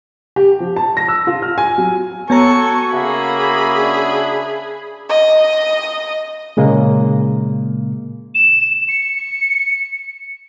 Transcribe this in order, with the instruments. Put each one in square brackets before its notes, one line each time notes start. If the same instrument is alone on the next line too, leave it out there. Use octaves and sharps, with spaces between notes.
[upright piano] G4
F3
A5
A#6
E6
F4
F6
G#5
F#3
[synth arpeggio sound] B3 C#5 A#5 [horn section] F#4 G#5 [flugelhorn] A4 [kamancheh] C#6
[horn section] C#3 F#4 E5 [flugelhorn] A#3 [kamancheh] G#4 B5
[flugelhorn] D4
[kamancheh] D#5
[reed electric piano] A#2 C#3 G#3 A#3
[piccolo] E7
C#7